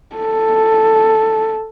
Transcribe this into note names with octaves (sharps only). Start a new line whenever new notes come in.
A4